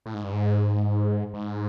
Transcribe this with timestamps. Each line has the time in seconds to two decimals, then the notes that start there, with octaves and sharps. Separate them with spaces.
0.06 A2
0.14 G#2
0.24 G2
0.33 G#2
1.34 G#2